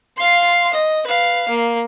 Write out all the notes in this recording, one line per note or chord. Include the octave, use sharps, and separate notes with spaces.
F5 C6
D#5
B4 F5
A#3